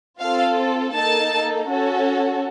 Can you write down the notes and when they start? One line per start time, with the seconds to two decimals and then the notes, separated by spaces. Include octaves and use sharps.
0.19 C4 F4 A4 F5
0.93 A#3 D#4 A4 A5
1.69 C#4 F#4 A4